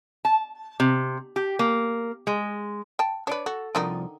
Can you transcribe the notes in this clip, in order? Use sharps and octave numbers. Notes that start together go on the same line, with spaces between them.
A5
C3
G4
A#3
G#3
G5 A5
D4 B4 C#5 D5
F#4 A4
C2 D3 D#3 F3 D#4 D5